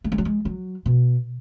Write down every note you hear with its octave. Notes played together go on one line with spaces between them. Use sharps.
A3
G#3
F#3
G#3
F#3
B2